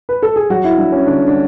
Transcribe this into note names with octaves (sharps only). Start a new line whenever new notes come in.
B4
A4
G#4
F#3 F#4
E4
F#3 D4
C#4
D3 D4
D4